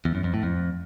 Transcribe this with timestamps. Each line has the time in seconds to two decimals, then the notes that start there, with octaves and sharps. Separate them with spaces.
0.05 E2
0.15 F#2
0.24 F2
0.34 A2
0.43 F2